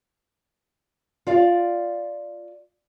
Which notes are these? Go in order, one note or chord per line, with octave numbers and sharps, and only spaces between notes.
F4 D5 F5